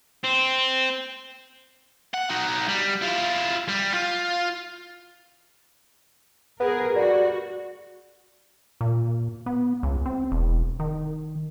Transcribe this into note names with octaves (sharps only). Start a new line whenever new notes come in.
C4
F#5
D#4 F#4
G3
E4 F4
G3
F4
B3 G#4 A#4
G3 F#4
A#2
B3
C#2
C4
E1
D#3